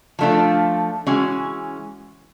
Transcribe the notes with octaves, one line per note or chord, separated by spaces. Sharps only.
F3 A3 D4 F4 A4
E3 G#3 C#4 F#4